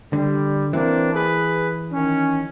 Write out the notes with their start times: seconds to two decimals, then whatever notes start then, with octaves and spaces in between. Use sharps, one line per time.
0.13 D3 G3
0.73 E3 A#3 C4 D4
1.14 G#4 B4
1.92 D#3 C#4